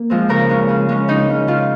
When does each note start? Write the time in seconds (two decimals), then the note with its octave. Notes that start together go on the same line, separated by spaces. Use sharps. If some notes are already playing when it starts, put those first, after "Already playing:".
Already playing: A#3
0.10 F3 G#3 C4
0.29 C#3 A#4
0.49 G#3 C#4
0.69 C#3
0.89 G#3 C#4
1.08 C#3 D#4
1.28 G#3 C#4
1.47 C#3 F4